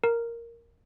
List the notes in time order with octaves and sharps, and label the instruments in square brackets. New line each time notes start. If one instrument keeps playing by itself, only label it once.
[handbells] A#4